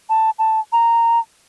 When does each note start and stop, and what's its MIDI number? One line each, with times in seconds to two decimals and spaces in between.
0.09 0.30 81
0.39 0.60 81
0.72 1.19 82